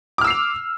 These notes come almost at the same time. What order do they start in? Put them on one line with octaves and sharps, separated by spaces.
D6 F6 E6 C7 F7